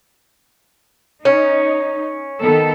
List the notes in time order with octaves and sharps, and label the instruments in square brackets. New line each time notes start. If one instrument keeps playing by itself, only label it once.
[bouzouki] C#4 [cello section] D#4
[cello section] D#3 B3 A4